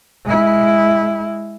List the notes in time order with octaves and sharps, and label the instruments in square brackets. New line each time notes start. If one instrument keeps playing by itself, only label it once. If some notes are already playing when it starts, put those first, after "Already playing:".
[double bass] G#3 E4